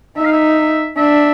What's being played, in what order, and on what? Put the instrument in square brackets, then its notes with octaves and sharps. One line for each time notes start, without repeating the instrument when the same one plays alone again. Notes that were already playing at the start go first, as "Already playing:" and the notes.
[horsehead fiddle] D#4 [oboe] E5
[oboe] F5
E5
[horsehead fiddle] D4 [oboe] E5